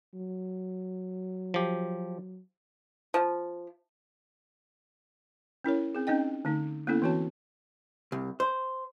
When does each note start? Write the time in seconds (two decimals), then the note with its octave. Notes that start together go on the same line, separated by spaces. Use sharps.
0.14 F#3
1.54 F3 G4
3.14 F3
5.64 C#4 E4 A#4 C#5
5.95 C4 G#4
6.07 C4 C#4 D#4 D#5 G5
6.45 D3 A3 D#4
6.87 A#3 B3 C#4 E4 A4
7.02 E3 C4 F#4 C#5 A5
8.12 C2
8.40 C5